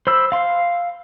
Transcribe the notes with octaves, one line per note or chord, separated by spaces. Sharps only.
C5 B5 E6
F5 C6